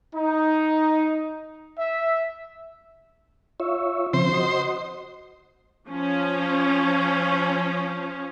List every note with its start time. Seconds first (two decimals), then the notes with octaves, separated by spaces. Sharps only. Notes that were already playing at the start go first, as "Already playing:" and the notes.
0.14 D#4
1.78 E5
3.60 F4 C#5 E5
4.13 C#3 F3 C4 C5
4.33 F#4 D#5
5.88 F3 C#4